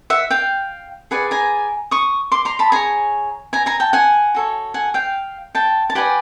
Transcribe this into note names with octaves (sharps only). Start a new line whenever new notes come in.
E5 F#5
F5 G5
G#4 B4 D5 F#5 G#5
G#5 A#5
C#6 D#6
C6 D6
A#5 C6
A5 B5
G#4 C#5 G#5 A#5
G#5 A#5
G#5 A#5
G5 A5
F#5 G#5
F#4 A4 C#5
F#5 G#5
F5 G5
G5 A5
A5
G4 B4 D5 F#5 G#5